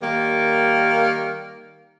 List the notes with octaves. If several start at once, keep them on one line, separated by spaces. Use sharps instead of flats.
D#3 G3 A#3